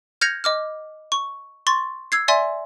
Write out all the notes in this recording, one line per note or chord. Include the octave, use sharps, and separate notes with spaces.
F6 G6 G#6 A#6 C#7 F7
D#5 D6 F6
C#6
C6 C#6 A6
E6 G#6 C7
D5 E5 G#5 C6